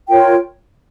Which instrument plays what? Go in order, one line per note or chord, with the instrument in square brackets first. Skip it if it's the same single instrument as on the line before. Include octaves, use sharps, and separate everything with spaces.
[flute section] F4 A#4 C#5 G5